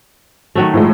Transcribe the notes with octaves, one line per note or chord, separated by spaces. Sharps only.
D#3 F#3 A3
A2 F3 G#3